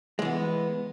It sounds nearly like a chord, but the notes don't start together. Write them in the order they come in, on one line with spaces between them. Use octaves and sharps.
G#3 E3 B3